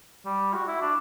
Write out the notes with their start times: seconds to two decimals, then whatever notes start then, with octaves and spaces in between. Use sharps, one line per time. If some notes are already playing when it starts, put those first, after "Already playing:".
0.25 G3
0.55 F#4
0.67 E4
0.81 D4